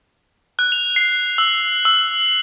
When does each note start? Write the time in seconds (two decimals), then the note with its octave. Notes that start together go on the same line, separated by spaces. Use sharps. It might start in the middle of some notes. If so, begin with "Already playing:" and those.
0.59 F#6
0.72 F7
0.96 C7
1.38 E6
1.85 E6